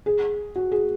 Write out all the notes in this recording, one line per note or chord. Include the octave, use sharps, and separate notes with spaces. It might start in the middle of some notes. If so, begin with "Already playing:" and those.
G#4
F#4
G#4